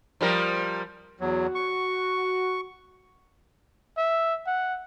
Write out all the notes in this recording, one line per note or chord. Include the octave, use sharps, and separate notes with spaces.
F3 G3 A#4
E2 F#3 F#4
C#6
E5
F#5